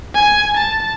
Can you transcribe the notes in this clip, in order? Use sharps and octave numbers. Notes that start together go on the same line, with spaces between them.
G#5
A5